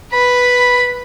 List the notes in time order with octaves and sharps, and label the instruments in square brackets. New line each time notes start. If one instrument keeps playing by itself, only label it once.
[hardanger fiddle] B4 [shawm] B5